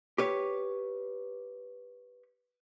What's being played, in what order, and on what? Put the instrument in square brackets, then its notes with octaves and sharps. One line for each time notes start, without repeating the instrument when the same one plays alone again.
[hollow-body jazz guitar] G4 B4 C#5